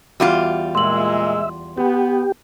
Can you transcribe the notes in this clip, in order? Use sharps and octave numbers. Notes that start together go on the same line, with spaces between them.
E2 G3 F4 F#4
A#2 G#3 E5 C6 F#7
B3 G4